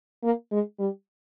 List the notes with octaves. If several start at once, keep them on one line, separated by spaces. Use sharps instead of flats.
A#3
G#3
G3